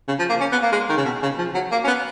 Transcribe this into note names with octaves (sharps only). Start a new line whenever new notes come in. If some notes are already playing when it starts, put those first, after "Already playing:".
C#3
F3
A#3
C#4
B3
A#3
G#3
D#3
C#3
B2
C#3
F3
F#3
A#3
C#4
B3